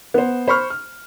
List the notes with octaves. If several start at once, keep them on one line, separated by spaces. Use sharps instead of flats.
B3 C5
C5 B5 C#6 F6
F6